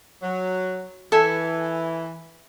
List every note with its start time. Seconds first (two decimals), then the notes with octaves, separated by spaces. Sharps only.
0.23 F#3
1.12 E3 A4 E5 G#5